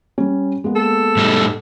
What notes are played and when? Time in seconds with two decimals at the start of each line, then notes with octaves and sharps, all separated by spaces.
0.18 G3 C#4
0.64 G#3 A#3 B3
0.76 A4
1.17 A2 G3 A3